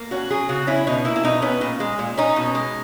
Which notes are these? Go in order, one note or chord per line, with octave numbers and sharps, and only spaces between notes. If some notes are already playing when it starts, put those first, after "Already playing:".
Already playing: A#3
C#4 F#4
F#3 G#4
C#3 F#4
C#4 E4
B2 D#4
A#3 E4
E4
B2 D#4
B3 C#4
A#2
G#3
A#2
C#4 D#4
B2
G#3